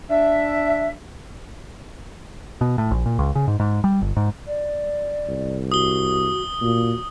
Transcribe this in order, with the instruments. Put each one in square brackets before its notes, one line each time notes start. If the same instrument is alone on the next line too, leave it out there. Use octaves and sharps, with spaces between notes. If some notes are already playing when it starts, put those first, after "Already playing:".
[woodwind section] D4 E5
[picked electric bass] B2
A2
A#1
A#2
C#2
C#3
G#2
G#2
G3
G1
G#2
[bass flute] D5
[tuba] C2
[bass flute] F#4 [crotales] D#6 G7
[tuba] A#2 [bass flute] F#4